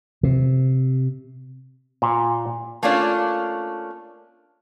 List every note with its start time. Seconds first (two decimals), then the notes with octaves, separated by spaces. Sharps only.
0.23 C3
2.02 A#2
2.83 A3 A#3 C#4 D4 F4